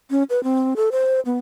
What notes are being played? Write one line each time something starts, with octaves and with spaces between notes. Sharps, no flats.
C#4
B4
C4
A4
C5
B3